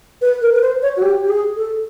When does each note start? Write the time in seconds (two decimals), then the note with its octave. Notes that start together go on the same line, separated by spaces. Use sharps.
0.22 B4
0.42 A#4
0.53 B4
0.62 C5
0.82 C#5
0.97 F#4
1.02 G4
1.24 G4
1.29 G#4
1.56 A4